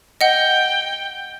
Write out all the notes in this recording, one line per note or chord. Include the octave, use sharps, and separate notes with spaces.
D#5 F#5 G5